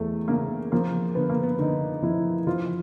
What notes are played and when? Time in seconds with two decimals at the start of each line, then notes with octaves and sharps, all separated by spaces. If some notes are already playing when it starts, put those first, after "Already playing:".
Already playing: E2 A3
0.28 C#3 A#3
0.72 F3 A#3
1.15 D3 B3
1.29 A#3
1.43 B3
1.59 D3 D#4
2.02 F3 E4
2.47 F3 F4